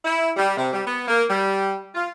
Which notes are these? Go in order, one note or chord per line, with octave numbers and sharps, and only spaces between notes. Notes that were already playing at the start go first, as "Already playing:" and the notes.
E4
G3
C3
G3
B3
A#3
G3
F4